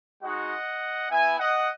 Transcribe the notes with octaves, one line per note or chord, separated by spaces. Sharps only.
G#3 D#4 F#4 D#5 F#5
B3 E4 E5 G#5
D#5 F#5